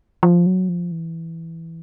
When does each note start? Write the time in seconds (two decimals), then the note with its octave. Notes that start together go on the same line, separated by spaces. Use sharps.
0.23 F3
0.46 F#3
0.69 F3
0.92 E3